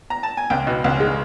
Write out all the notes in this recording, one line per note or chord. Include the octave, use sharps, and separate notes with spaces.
A#5
A5
G#5
C#2 G5
B2
C#2
G#3